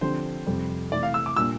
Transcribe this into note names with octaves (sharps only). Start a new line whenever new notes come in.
D3 F3 C4 G4 C5
F2 C3 G3
C3 E3 A3 D5
F5
E6
D6
A#2 G3 D4 F4 E6